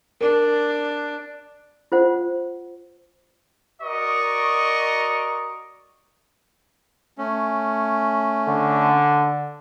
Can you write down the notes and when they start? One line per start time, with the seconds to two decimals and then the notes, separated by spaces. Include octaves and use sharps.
0.21 D4 A#4
1.92 F4 C5 F#5
3.81 F#4 A#4 D5 D#5 C#6
7.18 A3 C#4
8.48 D3